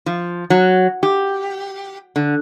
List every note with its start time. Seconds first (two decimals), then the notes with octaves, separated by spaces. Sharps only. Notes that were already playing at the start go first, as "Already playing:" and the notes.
0.06 F3
0.50 F#3
1.03 G4
2.16 D3